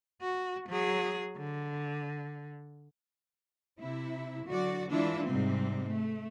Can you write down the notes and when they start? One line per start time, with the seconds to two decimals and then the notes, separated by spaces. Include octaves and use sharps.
0.21 F#4
0.68 F#3 G#4
1.37 D3
3.79 C3 E4
4.46 D3 F#3 F#4 D5
4.90 E3 G#3 D4 E4 F4
5.26 G#2 C3 G3 C4
5.86 A3